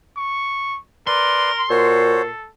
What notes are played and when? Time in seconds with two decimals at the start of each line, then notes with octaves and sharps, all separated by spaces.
0.17 C#6
1.07 A#4 B4 D5 C6
1.70 A#2 F#4 A4 C5 C#5